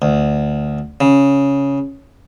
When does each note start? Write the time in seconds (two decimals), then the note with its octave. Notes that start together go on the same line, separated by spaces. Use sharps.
0.02 D2
1.01 C#3